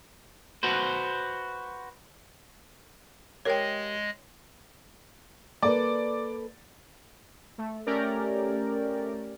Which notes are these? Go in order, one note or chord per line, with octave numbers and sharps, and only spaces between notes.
F#4 B4 C5
G#3 G4 A#4 C#5 D#5 F5 G5
A#3 A4 B4 D5
A3
A3 C#4 G4 A#4 D5